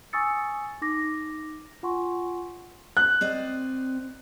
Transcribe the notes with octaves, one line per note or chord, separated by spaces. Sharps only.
G#5 C#6 D#6 E6 A6 C#7
D#4 D6 A#6
F4 F#5 G#5 C6 C#6
F#6
C4 D5 D#5